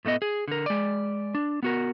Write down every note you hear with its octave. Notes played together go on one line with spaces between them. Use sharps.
A2 A3 B3 D#5
G#4
D3 A#4
G#3 D5
D4
B3 F#4 A#4